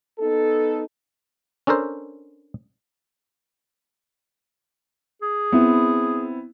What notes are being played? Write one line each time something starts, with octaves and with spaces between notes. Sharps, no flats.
B3 D#4 A4
C#4 D4 A4 A#4 C5
G#4
B3 C4 E4